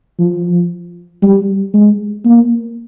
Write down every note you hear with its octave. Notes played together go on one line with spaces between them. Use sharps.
F3
G3
G#3
A#3